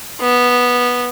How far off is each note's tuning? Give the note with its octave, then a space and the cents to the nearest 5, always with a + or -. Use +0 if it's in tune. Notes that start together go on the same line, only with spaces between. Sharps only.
B3 -10